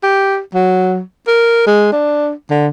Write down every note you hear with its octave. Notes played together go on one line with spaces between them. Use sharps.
G4
F#3
A#4
G#3
D4
D3